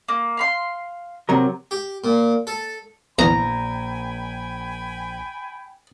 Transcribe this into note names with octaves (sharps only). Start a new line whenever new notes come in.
A#3
F5 B5 C6
C3 F#3 A#4
G4
A#2
A4
A#1 E2 G5 G#5 A#5 B5